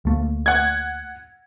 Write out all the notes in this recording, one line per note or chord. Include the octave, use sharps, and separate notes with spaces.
D2 A3 A#3
F#5 G#6